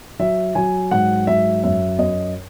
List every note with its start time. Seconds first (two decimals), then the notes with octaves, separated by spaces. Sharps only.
0.19 F#3 E5
0.55 F#3 G#5
0.91 G#2 F#5
1.27 F#3 E5
1.64 F#2 E5
1.99 F#2 D#5